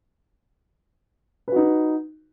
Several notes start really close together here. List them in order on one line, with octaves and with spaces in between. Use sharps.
B4 F#4 D#4